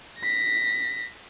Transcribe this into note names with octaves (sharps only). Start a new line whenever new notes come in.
A#6 B6